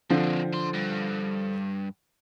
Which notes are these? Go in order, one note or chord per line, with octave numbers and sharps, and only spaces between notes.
D3 F3 C4 D4
D4 C6
G2